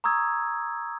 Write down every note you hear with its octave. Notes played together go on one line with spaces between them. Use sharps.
A#5 C#6 D#6 E6 G#6